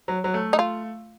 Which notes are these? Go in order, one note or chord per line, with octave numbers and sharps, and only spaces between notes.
F#3
F#3
A3
D#4
F4